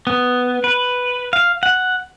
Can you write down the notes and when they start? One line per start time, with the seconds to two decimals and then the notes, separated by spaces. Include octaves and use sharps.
0.07 B3
0.64 B4
1.33 F5
1.63 F#5